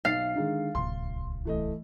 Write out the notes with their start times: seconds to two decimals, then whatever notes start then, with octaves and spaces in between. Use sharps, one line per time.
0.05 B1 F5 A6 C7
0.35 D3 D#3 G#3
0.75 D1 C2 C6
1.45 E3 A3 D#5